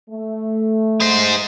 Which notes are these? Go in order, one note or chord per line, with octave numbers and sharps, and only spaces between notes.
A3
G#3 C5